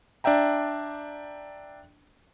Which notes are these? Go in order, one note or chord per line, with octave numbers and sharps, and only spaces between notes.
D4 D5 E5 G5 A#5